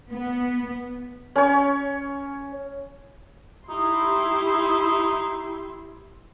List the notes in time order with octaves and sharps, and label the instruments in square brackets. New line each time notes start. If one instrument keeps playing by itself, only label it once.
[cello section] B3
[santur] C#4 C#5
[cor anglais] D#4 [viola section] E4 G4 C6